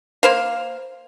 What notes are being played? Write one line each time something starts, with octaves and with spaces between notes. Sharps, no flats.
A#3 C5 F5